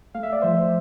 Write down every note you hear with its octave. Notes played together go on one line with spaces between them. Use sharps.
A3 F5
E5
D5
F3 C5 E5